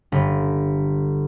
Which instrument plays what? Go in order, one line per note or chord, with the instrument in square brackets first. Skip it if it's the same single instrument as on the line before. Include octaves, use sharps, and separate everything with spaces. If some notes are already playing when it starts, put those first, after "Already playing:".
[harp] G1